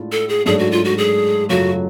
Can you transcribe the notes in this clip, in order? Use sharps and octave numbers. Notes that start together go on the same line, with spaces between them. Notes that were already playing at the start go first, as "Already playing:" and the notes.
Already playing: A2 G#3 D4 F4
A4
G#4
G#2 F#3 A3 D4 G#4
F#4
F4
F#4
G#4
F#2 C#3 F#3 A3 F4 F#4